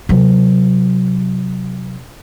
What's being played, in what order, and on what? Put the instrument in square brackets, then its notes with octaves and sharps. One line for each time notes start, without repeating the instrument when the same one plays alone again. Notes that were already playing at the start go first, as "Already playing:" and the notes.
[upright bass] C3 F#3